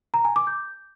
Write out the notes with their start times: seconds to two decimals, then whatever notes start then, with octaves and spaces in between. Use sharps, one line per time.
0.14 A#5
0.25 G#5
0.36 D6
0.47 G6